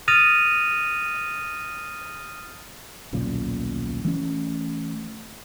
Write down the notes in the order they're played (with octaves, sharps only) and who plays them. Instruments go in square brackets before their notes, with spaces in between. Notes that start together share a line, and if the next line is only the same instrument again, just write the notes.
[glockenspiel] D#6 F6 A6 A#6 D#7 F7
[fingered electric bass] D#1 B1 A#2 C#3
E3 A3 C#4